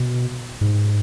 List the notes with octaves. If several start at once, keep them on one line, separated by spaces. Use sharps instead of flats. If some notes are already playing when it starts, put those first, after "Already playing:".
Already playing: B2
G#2